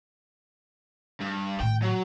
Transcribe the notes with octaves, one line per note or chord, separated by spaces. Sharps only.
G2
A2 D#3 G5
F#3